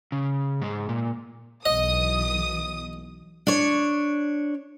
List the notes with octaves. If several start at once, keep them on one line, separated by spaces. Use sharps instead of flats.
C#3
G#2 G#3
A#2
B1 E3 D#5 D#6
D4 C#5